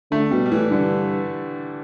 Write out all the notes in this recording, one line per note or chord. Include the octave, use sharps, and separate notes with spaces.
D3 A3
B2 G3
G3
A2 E3
G2 D3